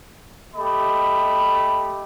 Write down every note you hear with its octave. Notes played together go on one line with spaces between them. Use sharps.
A3 G4 D#5 B5